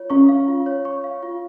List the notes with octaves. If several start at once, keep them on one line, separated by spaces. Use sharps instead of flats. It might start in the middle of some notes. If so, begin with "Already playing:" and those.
Already playing: F4 C#5
C#4 C#6
F5
F4
C#5
C#6
F5
F4